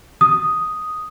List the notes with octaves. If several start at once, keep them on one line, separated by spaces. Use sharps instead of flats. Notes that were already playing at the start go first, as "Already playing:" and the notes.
D#6